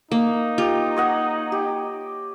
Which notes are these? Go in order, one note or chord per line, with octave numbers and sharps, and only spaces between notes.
A#3 D#4
F4 G4
C#5 D#5 F#5
G4